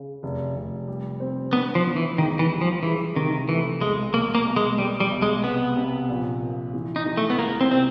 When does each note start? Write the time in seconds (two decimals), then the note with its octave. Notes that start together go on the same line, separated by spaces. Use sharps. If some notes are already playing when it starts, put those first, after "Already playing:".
Already playing: C#3
0.23 F1
0.56 F1
0.88 G3
1.20 C4
1.53 B3 D4
1.75 F3
1.86 B3
1.96 E3
2.18 C#2 D#3
2.39 E3
2.50 G3
2.61 F3
2.83 E3 G#3
3.15 C3 D#3
3.49 E3 A3
3.81 B1 G#3
4.13 B2 A#3
4.35 A#3
4.46 B2
4.56 G#3
4.78 G3 B3
5.00 G3
5.12 B1
5.22 G#3
5.43 C3 B3
5.76 C3
6.09 A#1
6.42 A#3
6.74 E3
6.96 D#4
7.06 E3
7.17 A3
7.30 B3
7.39 C#2 A#3
7.61 C4
7.71 C3 C4